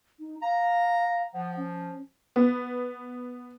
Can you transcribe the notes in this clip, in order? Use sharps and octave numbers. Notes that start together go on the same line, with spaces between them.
D#4
F5 A#5
F3 F#5
C#4
B3